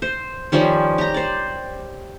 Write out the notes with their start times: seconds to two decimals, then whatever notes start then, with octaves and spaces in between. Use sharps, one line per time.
0.02 C5
0.52 D#3 F3 G3 C#4
0.98 G4 A#5
1.14 C5 D5